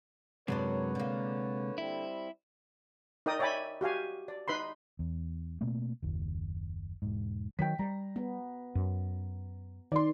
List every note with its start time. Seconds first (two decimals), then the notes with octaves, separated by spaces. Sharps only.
0.48 F#2 C3 F#3 G#3 D4 B4 C#5
0.95 D3 A#3
1.78 G3 C4 E4
3.26 D#4 A#4 D5 G5 D#6
3.39 C#5 D5 E5 G5 G#5 B5
3.81 F#4 G4 F5 G#5
4.28 D5
4.48 D#4 B4 B5 C6
4.99 E2
5.61 B2 A3 A#3 C4
6.03 F#1 D#2
7.02 E1 G#2
7.59 D#3 F#3 G5 B6
7.79 G3 A#5
8.16 B3
8.75 F#2
9.92 D#3 D5 C6